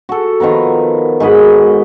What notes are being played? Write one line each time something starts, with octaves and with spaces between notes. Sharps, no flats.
F#4 A4
D#3 F3 B3 A#5
G#2 F#4 D#5 B5